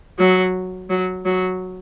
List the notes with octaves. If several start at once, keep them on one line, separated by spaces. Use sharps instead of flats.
F#3
F#3
F#3